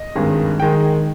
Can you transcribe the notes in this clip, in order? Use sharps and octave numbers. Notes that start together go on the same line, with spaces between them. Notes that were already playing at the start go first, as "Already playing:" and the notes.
Already playing: D#5
G#1 G2 D#3 G#3
D#3 G#3 G5